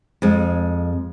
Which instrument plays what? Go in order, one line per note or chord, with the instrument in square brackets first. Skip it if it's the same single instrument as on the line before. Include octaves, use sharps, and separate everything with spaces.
[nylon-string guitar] F2 G#3